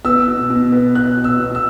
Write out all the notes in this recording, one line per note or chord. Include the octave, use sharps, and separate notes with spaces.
B3 E6
B2
B2
B3
B3 F#6
B2
E6
B2
E6